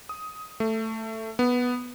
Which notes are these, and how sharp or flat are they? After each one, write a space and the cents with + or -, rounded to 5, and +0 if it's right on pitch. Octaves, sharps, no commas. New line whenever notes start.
D#6 +15
A3 +10
B3 -5